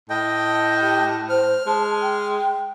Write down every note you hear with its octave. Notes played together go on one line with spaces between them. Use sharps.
A2 D#5 G5
G4
C5 F6
G#3 A5
G5